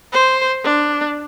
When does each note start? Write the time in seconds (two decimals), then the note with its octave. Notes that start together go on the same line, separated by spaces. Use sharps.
0.13 C5
0.64 D4